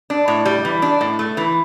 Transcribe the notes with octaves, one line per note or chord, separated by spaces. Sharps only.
D4
A2
G3
E3
D4
A2
A3
E3